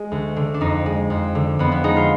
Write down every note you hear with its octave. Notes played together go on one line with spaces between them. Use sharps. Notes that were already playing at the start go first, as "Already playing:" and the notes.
Already playing: G#3
D2
D3
D4
F2 D#4
G#3
F2
D3
F2 B3
B3
G#3 D#4
F4